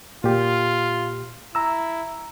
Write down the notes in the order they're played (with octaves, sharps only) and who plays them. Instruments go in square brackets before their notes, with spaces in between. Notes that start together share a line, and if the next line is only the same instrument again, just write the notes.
[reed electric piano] A#2 G4 [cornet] F4
[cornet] E4 [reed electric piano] A#5 E6